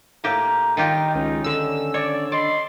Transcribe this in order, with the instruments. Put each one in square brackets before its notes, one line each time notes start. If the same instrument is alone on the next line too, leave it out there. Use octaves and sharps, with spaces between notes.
[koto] A2 A#3 G4 [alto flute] A#5
[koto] D#3 F4 G4 [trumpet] D#4 [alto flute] G5
[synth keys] C#2 [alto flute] C#4
[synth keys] D3 E6
[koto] C#5 [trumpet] D5
[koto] D5 [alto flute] D#5 [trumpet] C6